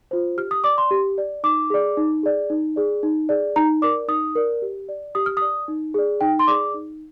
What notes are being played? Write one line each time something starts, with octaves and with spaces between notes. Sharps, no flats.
F4 C5
G4 F6
D#6
D5 D6
C6
G4
D5
D#4 D6
G#4 D5
D#4
G#4 D5
D#4
G#4 D5
D#4
G#4 D5
D#4 A#5
A#4 D5 D6
D#4 D#6
A#4 D5
G4
D5
G4 D#6
F6
D5 D#6
D#4
G#4 D5
D#4 G5
C6
G#4 D5 D6
D#4